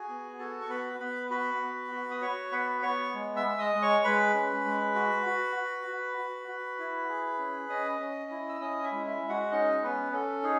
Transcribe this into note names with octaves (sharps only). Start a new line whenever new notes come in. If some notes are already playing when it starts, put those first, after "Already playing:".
Already playing: F#4 G#4 G#5
B3
F#4 A4 A5
C#6
B3 B4 B5
B3 B4 B5
F#4 B4 B5
B3
F#4
D#6
F#4 C#5 C#6
B3 B4 B5
B3 C#5 C#6
G#3
E5 E6
G#3
D#5 D#6
G#3
C#5 C#6
G#3 B4 B5
C#4
G#3
F#4
F#4
F#4
F#4
F#4
F#4
E4
G#4
C#4
C#4 D#5 D#6
C#4
E4
E6
C#4 D#5 D#6
E4 E5
G#3
E4 E5
G#3
F#4 F#5
C#4 D#4 D#5
B3 C#4 B4
C#4 A4
D#4 G#4